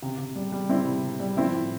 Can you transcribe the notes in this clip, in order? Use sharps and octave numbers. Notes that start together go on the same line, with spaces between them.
C3
C3
G3
G3
G3 C4 E4
C3
C3
G3
F3 C4 E4
A2